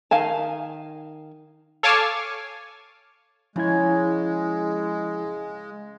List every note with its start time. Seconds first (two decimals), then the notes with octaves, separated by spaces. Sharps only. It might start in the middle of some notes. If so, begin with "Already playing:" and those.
0.11 D#3 F5 G#5 A5
1.83 A4 C#5 F5 G#5 A5 D6
3.56 C#3 F3 G#3 E4 G#6